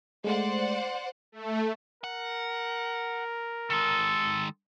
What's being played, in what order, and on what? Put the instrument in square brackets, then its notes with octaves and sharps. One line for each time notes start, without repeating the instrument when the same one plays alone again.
[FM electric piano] G#3 A3 [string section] C5 D5 F#5
[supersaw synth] A3
[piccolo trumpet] A#4 [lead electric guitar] F#5
[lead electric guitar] D#3 G#3 [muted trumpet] A4